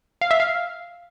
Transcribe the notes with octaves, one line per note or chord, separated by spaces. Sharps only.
F5
E5
F5